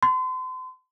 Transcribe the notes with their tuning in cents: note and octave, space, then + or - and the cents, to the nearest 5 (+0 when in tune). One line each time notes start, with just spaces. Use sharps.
C6 -40